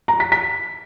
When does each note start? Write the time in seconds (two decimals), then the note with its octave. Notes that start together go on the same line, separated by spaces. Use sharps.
0.08 A#5
0.20 B6
0.32 B6